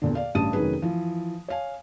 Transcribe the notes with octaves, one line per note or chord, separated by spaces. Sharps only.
E2 A#2 D3
D5 F5
A1 G2 C#3 A5 D#6 D#7
F1 D#3 F#3 C#4 G#4 B4
E3 F3
C#5 F5 G#5